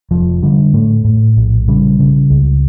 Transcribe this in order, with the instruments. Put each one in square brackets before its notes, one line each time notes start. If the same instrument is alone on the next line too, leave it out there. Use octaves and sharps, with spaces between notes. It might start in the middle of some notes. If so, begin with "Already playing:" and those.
[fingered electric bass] F1 F3
D3 G3
A2 A3
A2
A#1
C#3 G3
C#3
C#2